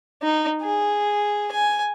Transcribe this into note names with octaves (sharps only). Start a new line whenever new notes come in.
D#4
G#4
G#5